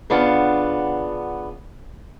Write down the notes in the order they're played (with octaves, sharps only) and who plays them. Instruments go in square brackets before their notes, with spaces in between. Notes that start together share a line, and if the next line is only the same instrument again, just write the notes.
[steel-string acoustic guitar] C#3 B3 D4 F4 F5 F#5